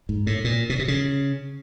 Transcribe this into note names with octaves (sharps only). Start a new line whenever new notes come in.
G#2
A2
A#2
B2
C3
C#3